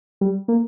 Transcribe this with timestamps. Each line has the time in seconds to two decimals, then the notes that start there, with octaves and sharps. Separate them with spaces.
0.21 G3
0.48 A#3